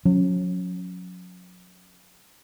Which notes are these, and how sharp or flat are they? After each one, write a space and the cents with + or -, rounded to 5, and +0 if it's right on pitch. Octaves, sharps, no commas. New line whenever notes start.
F#3 -35 C#4 +0